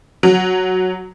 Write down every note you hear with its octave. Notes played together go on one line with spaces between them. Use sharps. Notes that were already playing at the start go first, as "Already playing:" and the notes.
F#3